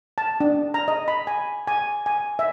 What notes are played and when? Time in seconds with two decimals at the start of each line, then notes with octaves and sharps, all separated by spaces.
0.18 A5
0.40 D4
0.74 A#5
0.88 D#5
1.08 B5
1.27 G#5
1.67 G#5
2.06 G#5
2.39 E5